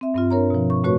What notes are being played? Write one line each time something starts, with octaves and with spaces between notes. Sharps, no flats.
C4 E5
G2 C4 F4
D4 A#4 C#5 A#5
B2 F3
C#6
A2 A3 F#4 B4 C#5 C#6